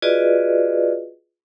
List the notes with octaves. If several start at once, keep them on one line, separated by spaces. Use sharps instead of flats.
F4 F#4 G#4 B4 D5 D#5